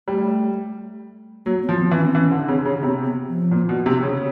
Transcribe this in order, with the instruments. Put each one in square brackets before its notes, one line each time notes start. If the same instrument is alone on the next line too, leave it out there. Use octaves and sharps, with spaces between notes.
[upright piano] G3 [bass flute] A3
[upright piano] F#3 [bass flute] A#3
[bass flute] B3
[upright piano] F3
[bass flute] B3
[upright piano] E3
[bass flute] C#4
C4
[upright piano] E3 [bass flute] C#4
[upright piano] D3
[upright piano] C#3 [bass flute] C4
[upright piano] C#3
[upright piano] C3 [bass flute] B3
[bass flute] B3
F3
[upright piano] A#2
B2
C3
C#3